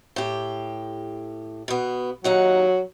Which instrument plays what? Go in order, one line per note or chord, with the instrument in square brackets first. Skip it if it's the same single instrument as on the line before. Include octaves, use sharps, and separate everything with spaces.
[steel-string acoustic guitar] A2 G4
B2 B3
[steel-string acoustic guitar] D#2 D#4 F#5 [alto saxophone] F#3